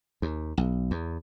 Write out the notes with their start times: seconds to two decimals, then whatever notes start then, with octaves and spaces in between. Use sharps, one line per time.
0.22 D#2
0.57 B1
0.91 E2